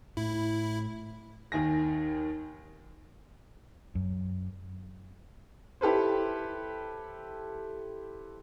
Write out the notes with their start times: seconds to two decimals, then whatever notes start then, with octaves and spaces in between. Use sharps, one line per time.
0.17 A2 E4
1.52 D#2 D#3 G#5 A#6
3.95 F#2
5.81 E4 G4 A4 B4 C5